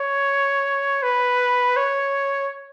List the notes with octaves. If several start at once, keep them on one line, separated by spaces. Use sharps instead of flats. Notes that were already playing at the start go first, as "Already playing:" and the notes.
Already playing: C#5
B4
C#5